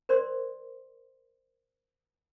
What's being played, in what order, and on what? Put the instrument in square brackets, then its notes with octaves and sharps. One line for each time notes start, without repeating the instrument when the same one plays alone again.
[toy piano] A#4 C5 D5 C6